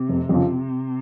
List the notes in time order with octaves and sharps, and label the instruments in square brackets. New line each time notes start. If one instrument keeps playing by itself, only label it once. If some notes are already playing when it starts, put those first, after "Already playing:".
Already playing: [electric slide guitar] C3
[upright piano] F1
F2 C#3 F3